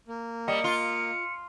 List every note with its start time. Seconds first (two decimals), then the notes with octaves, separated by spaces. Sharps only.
0.08 A#3
0.48 G3 D#5 C#7
0.64 F4